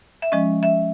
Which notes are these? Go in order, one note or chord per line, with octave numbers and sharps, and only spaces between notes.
E5
F3 G#3 C#4 D#5
E5